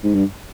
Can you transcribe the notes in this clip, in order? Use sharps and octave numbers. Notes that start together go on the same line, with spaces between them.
G#2
G2